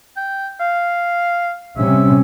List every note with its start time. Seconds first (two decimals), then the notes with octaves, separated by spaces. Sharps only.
0.17 G5
0.60 F5
1.77 C3 G3 C#4 E5